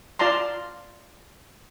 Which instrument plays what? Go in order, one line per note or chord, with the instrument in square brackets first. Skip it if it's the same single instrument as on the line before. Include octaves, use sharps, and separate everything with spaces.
[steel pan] F4 D5 A5 A#5 C6